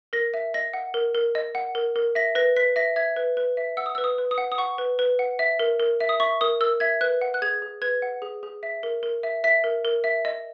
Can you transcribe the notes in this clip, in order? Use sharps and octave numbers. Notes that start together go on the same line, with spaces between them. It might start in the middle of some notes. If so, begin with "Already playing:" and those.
A#4 A#6
E5
D#5 A#6
F#5
A#4
A#4
D#5
F#5
A#4
A#4
E5 A#6
B4 A#6
B4 B6
E5 A#6
E5 G#6
B4
B4
E5
F#5 E6
D#6
E6
B4
D#6
B4
D#6
F#5
D#6
F#5 C#6
B4
B4
F#5
E5
A#4
A#4
E5
D#6
E5 C#6
A#4 D#6
A#4 E6
E5 G#6
B4 F#6
F#5
F#6
G#4 G#6
G#4
B4 G#6
F#5
G#4
G#4
E5
A#4
A#4
E5
E5 B6
A#4
A#4
E5
D#5